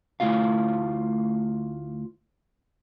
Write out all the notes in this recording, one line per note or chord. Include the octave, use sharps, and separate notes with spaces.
D2 C#3 A3 E4 F4 F5